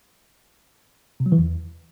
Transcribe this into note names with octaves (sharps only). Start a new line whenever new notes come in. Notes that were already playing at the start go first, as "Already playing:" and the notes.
C3
F#3
E3
E2